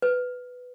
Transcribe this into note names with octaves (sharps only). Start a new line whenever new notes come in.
B4